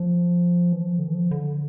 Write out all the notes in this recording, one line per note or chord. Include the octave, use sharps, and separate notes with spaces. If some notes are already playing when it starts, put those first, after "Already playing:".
Already playing: F3
E3
F3
D3
E3
F3
D3